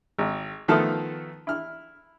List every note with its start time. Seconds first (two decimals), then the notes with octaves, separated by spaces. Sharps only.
0.18 G#1
0.68 D#3 F3 A3 B3 A4 F6
1.47 E4 F6